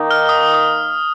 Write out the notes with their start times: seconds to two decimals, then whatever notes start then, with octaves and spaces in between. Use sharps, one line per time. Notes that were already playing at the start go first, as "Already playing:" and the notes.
Already playing: D#3 A#3 D#4
0.11 F6
0.29 D#6
0.54 D#6